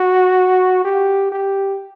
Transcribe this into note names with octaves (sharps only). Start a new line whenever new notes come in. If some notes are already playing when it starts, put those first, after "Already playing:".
Already playing: F#4
G4
G4